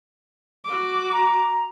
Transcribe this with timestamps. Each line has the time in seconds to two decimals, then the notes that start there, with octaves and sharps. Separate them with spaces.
0.65 F#4 D6
1.12 A#5